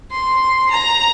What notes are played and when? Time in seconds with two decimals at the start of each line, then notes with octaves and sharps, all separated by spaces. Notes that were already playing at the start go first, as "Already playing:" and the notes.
0.11 C6
0.71 A#5